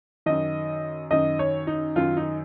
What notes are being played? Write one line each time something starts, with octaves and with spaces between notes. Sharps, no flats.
F#2 D#3 D#5
F#2 D#3 D#5
C#5
D#4
F#2 D#3 F4
D#4